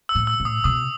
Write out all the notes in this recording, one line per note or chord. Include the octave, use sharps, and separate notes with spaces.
E6
A2
E6
A2
D#6
B2 D#6